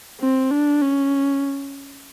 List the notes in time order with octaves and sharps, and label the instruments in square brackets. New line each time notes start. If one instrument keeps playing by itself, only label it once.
[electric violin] C4
D4
C#4